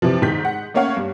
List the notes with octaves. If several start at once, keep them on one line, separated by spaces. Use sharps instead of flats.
C3 E3 F3
G#2 D#3 G6 B6
G#3 F#5
A3 A#3 C#4 C#5 F5 F#5
G2